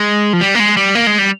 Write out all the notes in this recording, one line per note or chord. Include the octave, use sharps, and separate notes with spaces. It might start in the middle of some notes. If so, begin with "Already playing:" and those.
Already playing: G#3
F3
G3
A#3
G#3
G3
A#3
G#3
G3